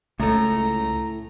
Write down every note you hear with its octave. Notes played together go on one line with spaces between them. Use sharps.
C#2 A2 A3 A#5